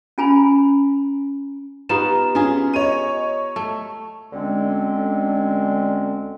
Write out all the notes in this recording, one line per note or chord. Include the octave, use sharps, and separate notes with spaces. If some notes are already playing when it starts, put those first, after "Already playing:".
C#4 F4 G#5 A#5 B5
B3 D#4 F4 G4 A#5 E7
C#4 F4 G#4
C#5 D#5 D#7
A3
D2 D3 G#3 C4 C#4